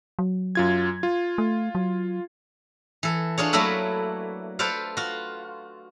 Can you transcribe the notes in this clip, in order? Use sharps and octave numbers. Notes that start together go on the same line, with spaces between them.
F#3
F#2 F4 G#6
F4
A3
F#3
E3 A4
D4 F4 G#4 C#5
F#3 A3 A#3 E4 A4 B4
F4 A4 B4 C5 D5 F5
F4 F#4